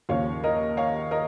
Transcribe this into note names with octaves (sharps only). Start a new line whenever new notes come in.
D#2 C#3 F3 C#5 F5
A#4 D#5
C#5 F5
A#4 D#5